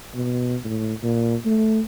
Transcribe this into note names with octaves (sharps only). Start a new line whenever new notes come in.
B2
A2
A#2
A3